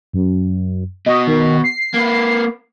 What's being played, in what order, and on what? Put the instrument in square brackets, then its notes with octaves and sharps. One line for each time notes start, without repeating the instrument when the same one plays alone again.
[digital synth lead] F#2
[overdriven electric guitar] B2 F#4 [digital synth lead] D#5
[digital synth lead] D#3
C7
[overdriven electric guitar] A#3 B4